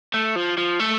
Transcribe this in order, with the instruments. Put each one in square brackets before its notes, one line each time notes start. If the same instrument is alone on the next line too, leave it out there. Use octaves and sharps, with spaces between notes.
[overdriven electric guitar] A3
F3
F3
A3